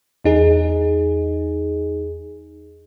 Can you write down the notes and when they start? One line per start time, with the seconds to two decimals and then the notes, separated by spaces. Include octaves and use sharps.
0.24 E2 D#4 G#4